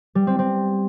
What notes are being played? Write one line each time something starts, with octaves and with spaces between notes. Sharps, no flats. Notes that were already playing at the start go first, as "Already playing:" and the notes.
G3
C4
C4